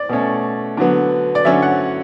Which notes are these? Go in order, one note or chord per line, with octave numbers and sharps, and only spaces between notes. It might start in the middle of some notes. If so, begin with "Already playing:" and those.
Already playing: D5
B2 A3 C#4
D3 F#3 B3
D5
D3 F#3 C#4 E5
F#5